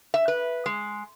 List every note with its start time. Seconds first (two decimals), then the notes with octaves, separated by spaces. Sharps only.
0.14 E5
0.28 B4
0.66 G#3